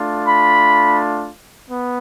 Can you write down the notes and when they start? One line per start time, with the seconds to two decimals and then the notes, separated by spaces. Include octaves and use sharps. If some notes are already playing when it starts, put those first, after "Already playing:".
Already playing: A3 D4 F4
0.28 B5
1.69 B3